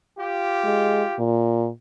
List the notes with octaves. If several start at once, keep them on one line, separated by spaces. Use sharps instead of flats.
F4 G4
G#3
A#2